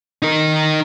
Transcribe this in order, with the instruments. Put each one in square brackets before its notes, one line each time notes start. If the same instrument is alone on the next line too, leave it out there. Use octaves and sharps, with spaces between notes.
[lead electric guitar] D#4 A#4